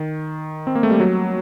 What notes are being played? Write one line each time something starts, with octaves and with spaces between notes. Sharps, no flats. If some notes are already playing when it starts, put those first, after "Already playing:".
Already playing: D#3
C4
A#3
A3
G3
F#3